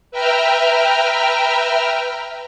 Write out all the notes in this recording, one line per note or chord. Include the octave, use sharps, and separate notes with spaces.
B4 E5 G5 A#5 F6